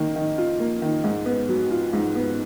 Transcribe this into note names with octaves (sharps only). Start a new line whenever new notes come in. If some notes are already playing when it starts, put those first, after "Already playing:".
Already playing: D#3 A#3
D#3
F4
A#3
D#3
G#2
B3
F#3
F4
G#2
B3